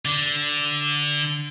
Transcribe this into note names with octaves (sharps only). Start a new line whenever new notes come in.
D3